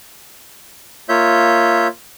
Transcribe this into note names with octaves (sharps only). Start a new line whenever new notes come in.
A#3 F4 C#5 E5 G6